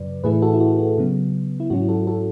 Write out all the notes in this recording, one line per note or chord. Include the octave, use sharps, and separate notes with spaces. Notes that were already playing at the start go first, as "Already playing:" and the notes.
Already playing: F#2 C#3 F#3 B4 D5
A2 E3 A3 E4 G#4 B4
F#4 A4
E4
F#4
F#4
C#3 F#3 B3
E4
G#2 F#3 C#4 E4 F#4
F#4 A4
F#4 A4